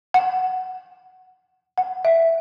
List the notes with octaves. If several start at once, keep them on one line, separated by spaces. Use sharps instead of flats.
F#5
F#5
E5